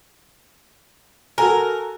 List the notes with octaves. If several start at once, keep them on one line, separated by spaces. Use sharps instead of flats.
F#4 A4 A#4 G#5